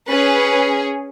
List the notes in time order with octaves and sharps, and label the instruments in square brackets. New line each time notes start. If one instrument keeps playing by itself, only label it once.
[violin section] C#4 G#4 B4